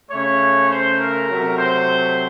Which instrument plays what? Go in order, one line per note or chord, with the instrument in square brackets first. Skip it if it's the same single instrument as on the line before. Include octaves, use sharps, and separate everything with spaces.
[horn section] C#3 A3 C#5
C5
A#4
C3 F#3 A3
C5